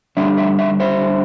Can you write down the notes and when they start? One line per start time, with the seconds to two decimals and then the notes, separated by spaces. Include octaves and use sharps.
0.17 D3 G3 D4 E5
0.38 E5
0.59 E5
0.80 C5 E5